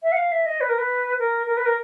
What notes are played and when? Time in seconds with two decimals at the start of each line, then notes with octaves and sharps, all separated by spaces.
0.03 E5
0.12 F#5
0.16 F5
0.32 E5
0.46 D#5
0.61 B4
0.69 A#4
0.78 B4
1.19 A#4
1.47 A#4
1.57 B4
1.66 A#4